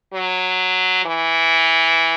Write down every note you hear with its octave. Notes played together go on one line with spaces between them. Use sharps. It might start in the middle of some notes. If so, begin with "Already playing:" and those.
F#3
E3